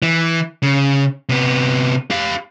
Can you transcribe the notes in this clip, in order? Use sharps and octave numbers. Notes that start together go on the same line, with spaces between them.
E3
C#3
C3 B3
G4 F5